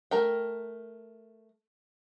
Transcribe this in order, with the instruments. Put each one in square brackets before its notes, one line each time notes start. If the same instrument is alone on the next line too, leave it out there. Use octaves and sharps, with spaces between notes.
[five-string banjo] A3 A#4 G5